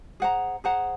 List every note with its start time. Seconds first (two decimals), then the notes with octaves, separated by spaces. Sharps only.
0.20 G#4 C5 F#5 A#5
0.64 G#4 C5 F#5 A#5